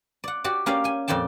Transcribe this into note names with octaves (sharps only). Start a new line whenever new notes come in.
D5 F#5
F#4 G4 D5
A#3 C#4 G4 D5 F5
G5 G#5
F2 A#2 D5 G5 A5